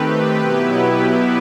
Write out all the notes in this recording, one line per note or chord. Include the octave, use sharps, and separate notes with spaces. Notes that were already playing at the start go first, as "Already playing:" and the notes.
Already playing: D#3 A3 C4 G4 B4
B2 F#3 B3 E4